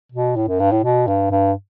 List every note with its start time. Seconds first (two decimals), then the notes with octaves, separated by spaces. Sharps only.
0.12 B2
0.36 A2
0.48 F#2
0.60 G2
0.71 A2
0.84 B2
1.07 G2
1.31 G2